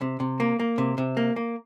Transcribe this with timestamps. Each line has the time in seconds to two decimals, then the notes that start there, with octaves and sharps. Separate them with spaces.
0.01 C3
0.20 C3
0.40 A#3
0.60 A#3
0.78 C3
0.98 C3
1.17 A#3
1.36 A#3